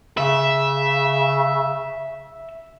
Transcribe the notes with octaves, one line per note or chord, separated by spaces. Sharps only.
C#3 E5